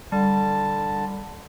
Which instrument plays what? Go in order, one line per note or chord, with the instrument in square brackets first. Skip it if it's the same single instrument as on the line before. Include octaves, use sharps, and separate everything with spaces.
[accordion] D3 A5 [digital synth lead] G3